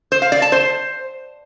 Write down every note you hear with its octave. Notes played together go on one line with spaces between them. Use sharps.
C5
F5
D5
A5
C5